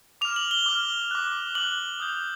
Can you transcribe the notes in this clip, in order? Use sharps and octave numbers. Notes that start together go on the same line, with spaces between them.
D6 F6 F7
F#7
G7
D6 F6
D6 F#6
D6 F#6 F#7
D#6 G6